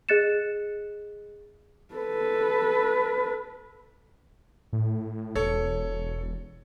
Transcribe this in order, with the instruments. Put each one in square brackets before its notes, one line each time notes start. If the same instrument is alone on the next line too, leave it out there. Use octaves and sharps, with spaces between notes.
[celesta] G#4 D#5 F#6 A6 C#7 E7
[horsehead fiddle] A4 B4
[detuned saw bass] A2
[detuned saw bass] E1 [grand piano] A4 C#5